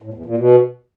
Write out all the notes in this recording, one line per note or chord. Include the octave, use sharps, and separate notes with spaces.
A2
E2
A#2
B2